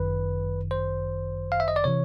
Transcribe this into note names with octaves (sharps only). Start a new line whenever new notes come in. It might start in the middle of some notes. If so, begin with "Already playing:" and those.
Already playing: G1 F#2 D#3 B4
C5
F5
E5
D#5
D5
C3 E3 C#5